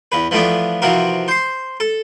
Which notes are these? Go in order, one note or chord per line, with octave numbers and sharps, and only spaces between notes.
E2 B4
E3 F3 A3 B3 D4
C3 E3 F3 F#4 A#4
C5 C6
A4